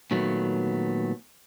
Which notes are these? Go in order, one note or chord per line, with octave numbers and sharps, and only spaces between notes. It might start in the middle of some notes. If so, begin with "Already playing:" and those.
A#2 D#3 F#3 A3 B3